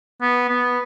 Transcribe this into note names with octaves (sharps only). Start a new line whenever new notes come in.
B3
B3